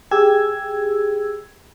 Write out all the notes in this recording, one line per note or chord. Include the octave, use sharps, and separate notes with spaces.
G4 G#4 E6 G#6